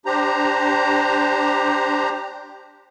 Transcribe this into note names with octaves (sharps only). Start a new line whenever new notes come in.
D4 G4 C5 A#5